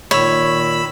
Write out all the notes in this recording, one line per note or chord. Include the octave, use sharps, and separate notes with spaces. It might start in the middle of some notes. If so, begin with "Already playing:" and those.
A#2 D#3 C#5 B5 E6